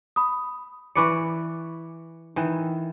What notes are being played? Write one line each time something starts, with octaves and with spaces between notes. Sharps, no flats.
B5 D#6
E3 B4 D5 C#6 D6 C#7
D#3 E3